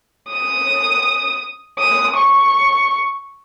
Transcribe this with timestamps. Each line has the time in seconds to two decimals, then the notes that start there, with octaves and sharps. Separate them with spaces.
0.30 D#6
1.79 D#6
2.16 C#6